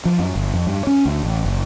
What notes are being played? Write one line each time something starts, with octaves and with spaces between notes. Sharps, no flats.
F3
F#2
G1
F2
G2
C#4
D2
A1
F#1